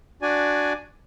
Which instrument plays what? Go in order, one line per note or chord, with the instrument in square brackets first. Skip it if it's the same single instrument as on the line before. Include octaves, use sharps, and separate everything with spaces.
[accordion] D4 F#4 D5 G#5